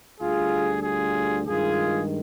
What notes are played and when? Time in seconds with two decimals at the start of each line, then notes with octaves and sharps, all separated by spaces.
0.20 D2 D3 G3 F4 G#4
0.83 F4 G#4
1.46 G2 D#3 G#3 F4 G#4